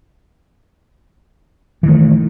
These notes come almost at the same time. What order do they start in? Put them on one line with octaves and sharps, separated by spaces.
E3 D#3 A3